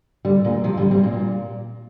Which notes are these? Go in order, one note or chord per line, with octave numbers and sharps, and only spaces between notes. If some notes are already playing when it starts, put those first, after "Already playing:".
D3 G3
A#2 D3
C3 F3
D3 G3
G3 C4
C3
A#2